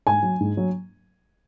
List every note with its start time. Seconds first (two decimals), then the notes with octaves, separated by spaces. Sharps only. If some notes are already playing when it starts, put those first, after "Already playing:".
0.07 G#2 G#5
0.23 F#3
0.40 G#2
0.57 F#3